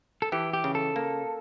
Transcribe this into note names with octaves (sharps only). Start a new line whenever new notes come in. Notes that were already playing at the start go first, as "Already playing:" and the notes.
A4
E3 G4
G4
C#3
A4
A#3